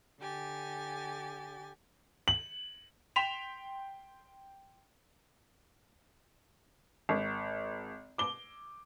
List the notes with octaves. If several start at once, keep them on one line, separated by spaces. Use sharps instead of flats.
D3 G4 G#5 A6
F#7
G5 C6 B6 E7 F7
G#1
D6 G7